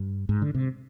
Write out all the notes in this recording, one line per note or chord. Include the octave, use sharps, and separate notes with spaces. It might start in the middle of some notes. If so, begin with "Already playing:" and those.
Already playing: G2
G#2
D3
C3